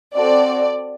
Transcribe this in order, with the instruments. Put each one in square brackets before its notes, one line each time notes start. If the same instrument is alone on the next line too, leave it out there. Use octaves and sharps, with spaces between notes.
[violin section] C4 F#4 A4 D5